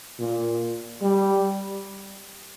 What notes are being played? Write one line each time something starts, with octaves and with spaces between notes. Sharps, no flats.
A#2
G3